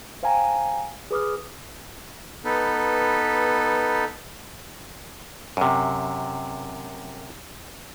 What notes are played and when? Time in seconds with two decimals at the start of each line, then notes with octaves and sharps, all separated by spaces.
0.23 C5 F5 G5 G#5 A#5
1.11 G#4 B4 D6 D#6 F6
2.45 B3 D#4 A4 B4
5.57 F#2 C3